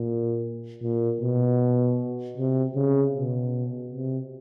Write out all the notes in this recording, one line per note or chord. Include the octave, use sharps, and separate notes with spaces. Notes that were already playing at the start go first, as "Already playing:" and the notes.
Already playing: A#2
A#2
B2
C3
C#3
B2
C3